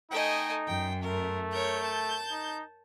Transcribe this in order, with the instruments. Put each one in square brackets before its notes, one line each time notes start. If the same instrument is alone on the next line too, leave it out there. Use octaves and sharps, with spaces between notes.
[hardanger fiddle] A3 D#5 [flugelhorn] D#4 [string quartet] G5 G#5
[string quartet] F#2 [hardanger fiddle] G5
[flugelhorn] A3 [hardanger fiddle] A#4
[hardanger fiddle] A#4 C#5 [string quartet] G6
[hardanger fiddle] A5
[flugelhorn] D#4